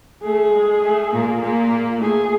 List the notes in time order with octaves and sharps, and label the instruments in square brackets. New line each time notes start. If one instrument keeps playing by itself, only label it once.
[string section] A3 [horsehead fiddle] G#4
[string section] G#3
A3
A#2 A#3
A#2 A#3
[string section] A3 [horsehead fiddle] G#4